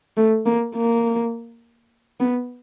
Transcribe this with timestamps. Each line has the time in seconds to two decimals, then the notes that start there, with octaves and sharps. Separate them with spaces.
0.17 A3
0.46 A#3
0.75 A#3
2.20 B3